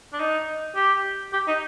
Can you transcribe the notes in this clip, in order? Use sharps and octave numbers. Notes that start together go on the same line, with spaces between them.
D4
D#4
G4
G4
D#4